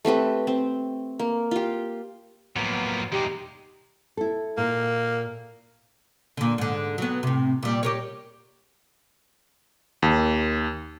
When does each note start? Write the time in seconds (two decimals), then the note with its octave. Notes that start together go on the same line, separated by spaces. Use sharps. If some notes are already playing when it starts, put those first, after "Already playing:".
0.05 A3 C4 G4 B4
0.47 C4
1.19 A#3
1.51 F4 G4
2.56 A2 F3 F#3 A#3 B3
3.12 E2 G#3 D#4 G4
4.17 E4 A4
4.58 A#2 A#3
6.37 A#2 D3
6.58 G#2 D3
6.98 F#3 B3
7.23 A2 C3
7.63 A#2 G3
7.83 G4 A#4 C#5
10.02 D#2